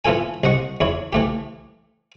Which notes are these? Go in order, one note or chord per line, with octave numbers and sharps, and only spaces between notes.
E3 B3 F4 A4 G#5
C2 D#5 F#5 C#6
E2 E4 C#5
E3 A3 G4